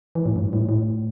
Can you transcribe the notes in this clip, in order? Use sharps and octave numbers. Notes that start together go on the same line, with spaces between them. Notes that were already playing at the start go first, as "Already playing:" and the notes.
E3
A2
G2
A2
A2